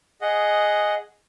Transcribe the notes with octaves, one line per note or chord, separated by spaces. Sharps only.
G#4 D#5 F#5